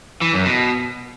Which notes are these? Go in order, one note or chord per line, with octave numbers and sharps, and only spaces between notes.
E3
F#2
B2